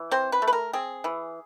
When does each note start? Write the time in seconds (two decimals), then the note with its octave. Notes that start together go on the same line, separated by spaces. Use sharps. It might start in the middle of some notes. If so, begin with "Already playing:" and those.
Already playing: E3
0.11 C4 C5
0.32 B4
0.42 A3
0.47 B4
0.53 A#4
0.73 C4 G#4
1.04 E3